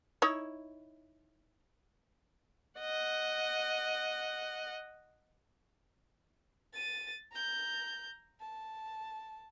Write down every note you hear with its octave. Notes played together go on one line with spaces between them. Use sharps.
D#4 E4 C#5
D#5 F#5
A6 D#7
A#5 G6
A5